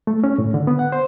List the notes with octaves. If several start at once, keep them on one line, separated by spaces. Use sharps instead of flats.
A3
C#4
A2
D3
B3
F#5
C5